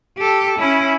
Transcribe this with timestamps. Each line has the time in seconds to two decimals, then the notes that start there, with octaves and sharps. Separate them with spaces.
0.18 G4 A4
0.58 C#4 E4